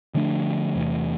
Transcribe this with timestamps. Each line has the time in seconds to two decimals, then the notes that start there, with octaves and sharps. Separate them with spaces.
0.14 D3 F3 A3 D4
0.75 E2 C3 E3 A3